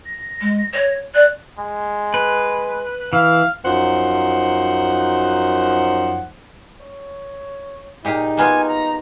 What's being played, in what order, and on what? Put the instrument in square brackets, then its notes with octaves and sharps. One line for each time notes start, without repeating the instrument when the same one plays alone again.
[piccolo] A#6
[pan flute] G#3
C#5
[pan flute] D5 [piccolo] F#6
[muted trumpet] G#3
[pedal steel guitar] B4
[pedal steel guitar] E3 [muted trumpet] F5
[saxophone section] F#2 F3 D#4 C5 F#5
[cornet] C#5
[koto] A#2 G4 G#4 [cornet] D#4
[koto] A#3 B3 F4 [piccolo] G#5
[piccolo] A#5